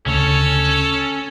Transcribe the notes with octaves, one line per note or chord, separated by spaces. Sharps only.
D2 C#3 C#4 A4 C#5